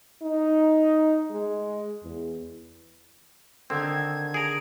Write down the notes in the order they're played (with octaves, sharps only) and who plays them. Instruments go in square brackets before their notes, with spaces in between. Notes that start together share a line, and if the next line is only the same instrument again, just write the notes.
[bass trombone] D#4
G#3
E2
[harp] D3 D#3 E6 [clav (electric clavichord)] C4 [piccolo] G#6
[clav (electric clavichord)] G#4 A#5 [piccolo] D7